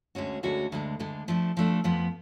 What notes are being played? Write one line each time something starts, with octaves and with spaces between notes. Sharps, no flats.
D2 D3 G#3 C#4 F#4
D2 D3 G#3 C#4 F#4
D2 D3 G#3
D2 D3 G#3
F3 A3 D4
F3 A3 D4
F2 F3 B3